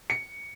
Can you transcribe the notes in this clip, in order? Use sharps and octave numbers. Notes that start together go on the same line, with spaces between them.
C#7